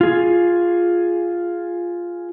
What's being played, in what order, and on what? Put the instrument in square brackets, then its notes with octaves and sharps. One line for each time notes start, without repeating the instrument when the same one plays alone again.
[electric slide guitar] F4 G#4